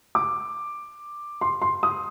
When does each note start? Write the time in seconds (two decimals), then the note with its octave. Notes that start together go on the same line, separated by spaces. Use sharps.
0.15 D6
1.41 C6
1.62 C6
1.83 D#6